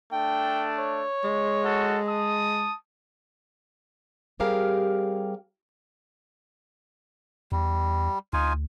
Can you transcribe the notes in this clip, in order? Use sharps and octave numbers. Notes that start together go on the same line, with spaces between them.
A3 D4 G5
C#5
G#3
F#4 A4
A5 D#6
G3 C4 G4 G#4 A#4 F5
E2 G3
D2 D#4 F4 G#5